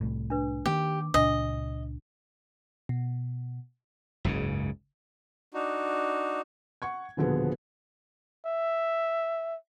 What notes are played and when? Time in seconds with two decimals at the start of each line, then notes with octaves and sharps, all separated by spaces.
0.01 C2 A2
0.30 D4 B4
0.66 D#3 A#3 G4
1.14 C#2 A#2 D4 D#5
2.89 B2
4.25 F#1 C#2 G#2 C#3
5.53 D4 D#4 F#4
6.82 F#5 C#6 G#6
7.17 D#1 B2 D3 F3 B3 G#4
8.45 E5